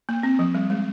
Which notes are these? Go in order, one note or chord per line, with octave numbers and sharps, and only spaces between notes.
A#3
C4
F3
G3
G#3